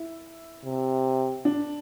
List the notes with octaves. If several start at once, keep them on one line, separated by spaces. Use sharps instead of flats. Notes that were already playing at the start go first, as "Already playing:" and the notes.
Already playing: E4
C3
D4